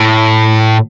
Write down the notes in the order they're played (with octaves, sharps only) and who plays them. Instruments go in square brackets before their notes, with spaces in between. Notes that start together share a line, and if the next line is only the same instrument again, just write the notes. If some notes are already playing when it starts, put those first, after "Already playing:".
Already playing: [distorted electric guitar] A2